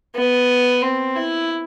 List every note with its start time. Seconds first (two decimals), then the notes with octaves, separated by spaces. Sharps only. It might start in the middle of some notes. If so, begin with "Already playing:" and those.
0.15 B3
0.82 C4
1.16 E4